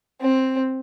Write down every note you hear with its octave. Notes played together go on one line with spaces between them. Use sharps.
C4